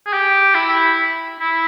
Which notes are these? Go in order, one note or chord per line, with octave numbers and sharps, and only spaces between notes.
G#4
G4
E4
E4